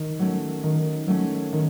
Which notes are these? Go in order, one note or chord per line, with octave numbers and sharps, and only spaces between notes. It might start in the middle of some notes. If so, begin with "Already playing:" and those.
Already playing: D#3
F#3 A3 C#4
D#3
F#3 A3 C#4
D#3